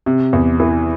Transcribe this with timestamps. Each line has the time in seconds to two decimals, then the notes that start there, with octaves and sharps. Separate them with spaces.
0.06 C3
0.33 E2
0.60 E3